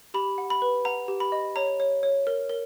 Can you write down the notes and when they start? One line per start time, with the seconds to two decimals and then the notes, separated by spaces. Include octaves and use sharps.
0.14 G4 B5
0.38 F#5
0.50 B5
0.62 B4
0.85 F#5 A#5
1.08 G4
1.20 B5
1.32 D#5
1.56 C#5 A#5
1.80 C#5
2.03 C#5
2.27 A#4
2.49 A#4